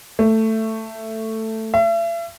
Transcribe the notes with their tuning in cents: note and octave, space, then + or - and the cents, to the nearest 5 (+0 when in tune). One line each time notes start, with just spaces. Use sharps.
A3 +10
E5 +40